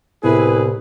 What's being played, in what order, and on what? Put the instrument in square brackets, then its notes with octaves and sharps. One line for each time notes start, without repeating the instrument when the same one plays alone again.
[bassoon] C2 [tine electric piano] A2 C3 B3 [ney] E4 [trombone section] G#4 B4